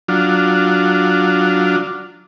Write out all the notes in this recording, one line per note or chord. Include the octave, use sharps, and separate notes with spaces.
F#3 D4 F4